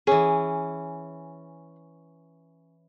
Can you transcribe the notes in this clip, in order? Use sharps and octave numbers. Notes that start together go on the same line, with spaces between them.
E3 C#4 G#4